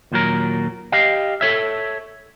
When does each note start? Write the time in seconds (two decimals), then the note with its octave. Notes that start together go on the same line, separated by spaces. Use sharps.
0.12 D#2 A#2 F#3 A#4
0.92 G4 D#5 F5
1.41 A4 C#5 E5